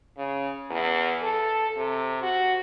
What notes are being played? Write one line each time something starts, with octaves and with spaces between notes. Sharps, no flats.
C#3
E2
A4
C3
F#4